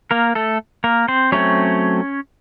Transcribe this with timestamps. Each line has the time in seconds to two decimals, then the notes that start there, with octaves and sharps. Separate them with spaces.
0.11 A#3 A#4
0.35 A3 A4
0.84 A#3 A#4
1.08 C4 C5
1.32 F#3 A3 C4 C#4 C#5